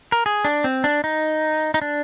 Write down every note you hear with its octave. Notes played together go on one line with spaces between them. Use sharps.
A#4
G#4
D4
C4
D4
D#4
D#4
D4